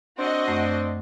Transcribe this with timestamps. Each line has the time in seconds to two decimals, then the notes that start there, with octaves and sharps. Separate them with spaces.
0.18 C4 D4 F#4 D#5
0.48 F#2 A3